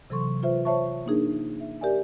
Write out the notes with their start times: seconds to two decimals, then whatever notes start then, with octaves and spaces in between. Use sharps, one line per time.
0.10 C3 E3 F#3 A4 C6 C#6
0.43 F4 B4 C5 E5
0.65 C5 C#5 E5 A5 C#6
1.06 A#3 D4 D#4 G#4 A#4
1.60 E5
1.81 G4 A#4 D5 E5 G#5